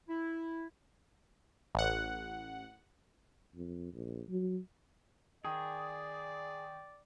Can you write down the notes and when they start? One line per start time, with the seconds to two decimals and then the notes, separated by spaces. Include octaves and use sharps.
0.09 E4
1.75 A1 F#5
3.56 F2
3.94 A#1
4.29 F#3
5.45 D#3 G#4 D5